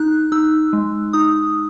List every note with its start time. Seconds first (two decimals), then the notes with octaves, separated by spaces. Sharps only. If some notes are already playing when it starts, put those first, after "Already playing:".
Already playing: D#4 F#6
0.32 D#4 E6
0.73 G#3
1.13 D#4 D#6